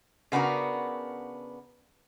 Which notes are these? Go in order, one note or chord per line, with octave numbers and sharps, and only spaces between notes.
C#3 B3 D4 F#4 A#4